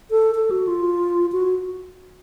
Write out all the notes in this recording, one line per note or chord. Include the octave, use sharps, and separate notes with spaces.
A4
A4
F#4
F4
F#4